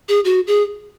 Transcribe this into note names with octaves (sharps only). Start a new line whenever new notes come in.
G#4
F#4
G#4